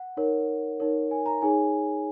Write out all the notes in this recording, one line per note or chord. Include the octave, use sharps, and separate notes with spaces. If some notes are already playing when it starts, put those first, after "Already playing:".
Already playing: F#5
D#4 A#4 C#5
D#4 A#4 C#5 F#5
G#5
A#5
D#4 G#4 C#5 G#5